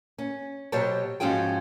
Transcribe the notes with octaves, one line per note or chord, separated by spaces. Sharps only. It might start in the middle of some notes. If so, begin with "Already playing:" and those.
C#4
B2 F#3 G4 C5 C#5 A5
G#2 F3 C#4 F#4 G#4 G5